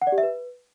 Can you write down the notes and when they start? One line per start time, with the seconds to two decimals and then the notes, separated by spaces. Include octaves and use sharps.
0.02 F#5
0.07 D5
0.12 G4
0.18 E5
0.23 B4